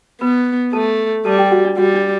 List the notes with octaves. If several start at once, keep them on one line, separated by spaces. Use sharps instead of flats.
B3 B4 B5
A3 A4 A5
G3 A4 A5
G4 G5
F#4 F#5
D4 D5
G3 F#4 F#5
D4 D5